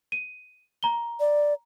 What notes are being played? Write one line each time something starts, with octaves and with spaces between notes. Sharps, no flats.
D#7
A#5 G7
D5